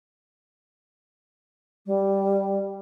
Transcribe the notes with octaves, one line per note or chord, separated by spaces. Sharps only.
G3